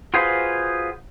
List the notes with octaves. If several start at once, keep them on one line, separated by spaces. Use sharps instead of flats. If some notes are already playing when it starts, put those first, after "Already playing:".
F4 F#4 G#4 B4 C5 F5